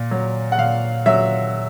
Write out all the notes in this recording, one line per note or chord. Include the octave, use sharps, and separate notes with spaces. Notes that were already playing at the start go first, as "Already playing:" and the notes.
Already playing: A#2
F#3
F#5
A#2 F5
F#3 E5